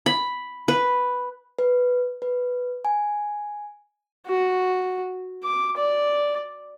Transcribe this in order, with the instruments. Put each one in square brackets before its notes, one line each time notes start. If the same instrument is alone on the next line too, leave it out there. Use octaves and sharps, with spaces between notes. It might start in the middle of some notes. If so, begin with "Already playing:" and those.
[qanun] B5
B4
[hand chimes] B4
B4
G#5
[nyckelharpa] F#4
D6
D5